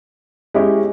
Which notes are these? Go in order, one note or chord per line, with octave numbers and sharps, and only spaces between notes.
G#3 C#4 E4 G4